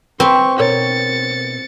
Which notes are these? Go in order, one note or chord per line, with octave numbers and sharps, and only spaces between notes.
C4 B4 C#6
B2 A#4 C#5 A6 C#7